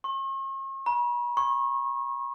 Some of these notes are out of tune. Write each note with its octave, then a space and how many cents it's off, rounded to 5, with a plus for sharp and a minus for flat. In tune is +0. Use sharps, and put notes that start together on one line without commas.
C#6 -45
B5 -45
C#6 -30